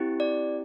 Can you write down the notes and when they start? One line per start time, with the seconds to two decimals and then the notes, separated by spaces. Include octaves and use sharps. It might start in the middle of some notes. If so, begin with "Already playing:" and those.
Already playing: C4 E4 G4
0.20 D5